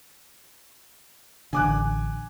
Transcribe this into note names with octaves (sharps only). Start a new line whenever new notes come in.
A1 D3 G#5 D6 F#6